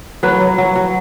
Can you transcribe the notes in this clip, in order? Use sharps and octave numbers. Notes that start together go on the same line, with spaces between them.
F#3 B4
F#3
F#3
F#3